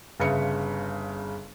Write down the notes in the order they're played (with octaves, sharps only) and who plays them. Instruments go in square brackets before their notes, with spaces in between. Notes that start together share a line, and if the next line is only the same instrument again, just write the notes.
[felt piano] G1 C#3 B4 E5 C#7